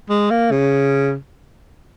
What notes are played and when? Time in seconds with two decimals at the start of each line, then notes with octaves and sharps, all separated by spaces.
0.10 G#3
0.30 A#3
0.52 C#3